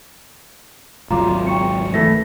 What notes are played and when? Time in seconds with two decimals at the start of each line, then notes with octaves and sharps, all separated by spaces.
1.11 G#1 C#2 F#3 F4 A#5 D6
1.47 G5 C#6 C#7
1.94 E3 A3 A#6